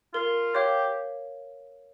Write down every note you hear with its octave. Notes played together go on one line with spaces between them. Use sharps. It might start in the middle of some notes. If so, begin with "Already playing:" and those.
F4 A#4
G4 C#5 F5